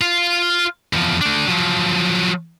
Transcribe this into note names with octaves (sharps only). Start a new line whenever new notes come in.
F4 F5
E2 F3
A3 D4
F3 F#3